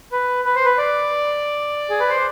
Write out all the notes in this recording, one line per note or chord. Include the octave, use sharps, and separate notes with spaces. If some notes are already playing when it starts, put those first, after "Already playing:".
B4
B4
C5
B4
D5
G#4
B4
C5